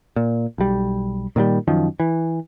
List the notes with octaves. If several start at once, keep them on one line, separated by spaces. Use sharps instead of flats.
A#2
B1 G3
A#2 D#3 E3 G3
F#2 D#3 F3
E3